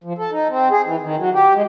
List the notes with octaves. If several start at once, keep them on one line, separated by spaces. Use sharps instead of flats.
F3
A4
D#4
C4
G#4
E3
D#3
F#3
G4
G#3